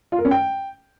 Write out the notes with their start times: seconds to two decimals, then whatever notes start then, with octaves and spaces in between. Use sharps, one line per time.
0.12 F4
0.18 A#4
0.25 C#4
0.31 G5